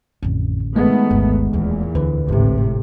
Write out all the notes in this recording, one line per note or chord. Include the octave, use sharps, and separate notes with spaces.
A1 F2 D3
D#3 G#3 A3 B3
G1 D2
D1 E2 A#2 E3
D2 D3 E3 B4
G#1 A2 C3 E4